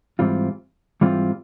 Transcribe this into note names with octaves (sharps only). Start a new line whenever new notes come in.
G#2 E3 G3 C4 F4
G#2 E3 G3 C4 F4